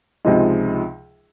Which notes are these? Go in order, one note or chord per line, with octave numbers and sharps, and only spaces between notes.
C#2 C3 F3 G#3 D#4